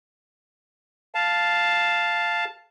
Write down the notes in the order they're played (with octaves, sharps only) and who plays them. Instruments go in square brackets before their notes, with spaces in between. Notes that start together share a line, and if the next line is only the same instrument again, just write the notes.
[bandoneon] F5 A5